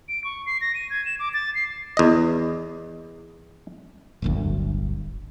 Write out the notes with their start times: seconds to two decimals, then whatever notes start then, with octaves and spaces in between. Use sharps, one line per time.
0.09 D7
0.24 C#6
0.46 C7
0.61 A#6
0.75 D#7
0.90 G#6
1.06 E7
1.19 D6
1.34 A6
1.55 C7
1.97 E2 D#5
4.22 D1 G1 D2